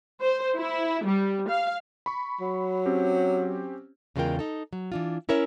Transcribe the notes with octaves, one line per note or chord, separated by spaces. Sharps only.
C5
E4
G3
F5
B5 C#6
F#3
C4 C#4 G4
E2 C#3 G#3 F4 A#4 G5
D#4 A4
F#3
E3 D4 F4
C#4 E4 A#4 C#5 E5